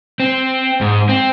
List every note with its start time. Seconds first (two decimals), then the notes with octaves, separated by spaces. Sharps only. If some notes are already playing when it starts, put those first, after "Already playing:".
0.20 C4
0.81 G#2
1.09 C4